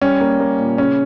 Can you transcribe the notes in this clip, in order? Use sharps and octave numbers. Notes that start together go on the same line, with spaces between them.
G3 C#4
A#3
A#3
A#2
C#3 C#4